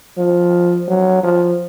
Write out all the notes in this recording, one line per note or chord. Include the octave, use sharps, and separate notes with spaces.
F3
F#3
F3